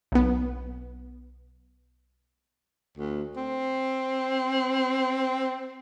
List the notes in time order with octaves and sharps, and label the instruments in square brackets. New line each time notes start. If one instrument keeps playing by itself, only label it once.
[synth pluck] B1 B3
[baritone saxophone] D2
C4